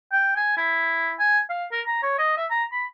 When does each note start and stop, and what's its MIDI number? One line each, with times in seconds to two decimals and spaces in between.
0.12 0.33 79
0.37 0.53 80
0.57 1.14 64
1.19 1.39 80
1.50 1.65 77
1.72 1.81 70
1.87 1.99 82
2.02 2.14 73
2.18 2.36 75
2.37 2.45 76
2.51 2.64 82
2.72 2.85 83